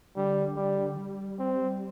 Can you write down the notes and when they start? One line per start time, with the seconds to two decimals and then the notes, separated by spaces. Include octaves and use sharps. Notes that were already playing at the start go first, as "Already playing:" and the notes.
0.16 D3 G3
0.56 G3
0.97 G3
1.39 C4